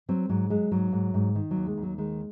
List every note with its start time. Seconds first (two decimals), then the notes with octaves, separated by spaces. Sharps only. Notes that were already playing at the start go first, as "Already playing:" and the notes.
0.09 F#3 C4
0.29 G#2 F#3
0.50 F#3 G#3
0.71 G#2 F#3
0.92 G#2
1.14 G#2
1.35 D#3
1.51 F#3
1.56 D#2
1.67 G#3
1.77 D#2
1.83 F#3
1.98 D#3 G#3